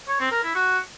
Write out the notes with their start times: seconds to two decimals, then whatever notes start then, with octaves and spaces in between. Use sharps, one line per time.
0.08 C#5
0.20 C4
0.32 A#4
0.43 E4
0.55 F#4